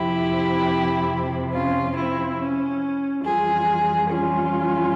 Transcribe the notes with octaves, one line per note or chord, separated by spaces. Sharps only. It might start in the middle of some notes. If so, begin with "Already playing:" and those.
Already playing: F2 C3 F3 E4 G4
C#4 F4
C4 E4
C#4
F2 E3 G3 F4 G#4
C#4 F4